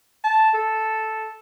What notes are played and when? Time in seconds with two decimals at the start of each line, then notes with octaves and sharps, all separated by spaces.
0.24 A5
0.54 A4